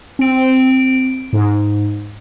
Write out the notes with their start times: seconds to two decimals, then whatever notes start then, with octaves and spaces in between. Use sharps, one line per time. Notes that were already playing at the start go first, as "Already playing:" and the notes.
0.19 C4 D7
1.33 G#2